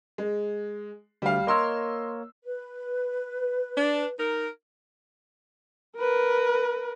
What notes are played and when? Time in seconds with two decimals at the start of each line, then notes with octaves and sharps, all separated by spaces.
0.18 G#3
1.22 D2 G3 F5
1.47 A#3 A#4 C#5 D#5 C6 E6
2.44 B4
3.75 D4
4.18 D#4 A#4
5.97 A#4 B4